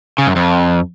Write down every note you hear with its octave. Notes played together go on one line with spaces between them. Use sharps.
C#3
F#2
F2